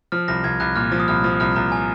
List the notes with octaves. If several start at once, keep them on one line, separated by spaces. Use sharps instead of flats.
F3 F6
C2 A#6
C2 G#6
C2 F#6
A#2 F6
F3
D#6
C2 F6
F3
C2 F6
C2 A#5
G#5